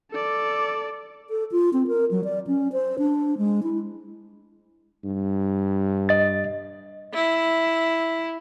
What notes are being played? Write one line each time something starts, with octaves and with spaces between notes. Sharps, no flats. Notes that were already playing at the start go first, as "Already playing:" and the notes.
A4 D5
A4
F4
C4
A#4
F#3
D5
C#4
C5
D4
G#3
E4
G2
D#5 A6
E4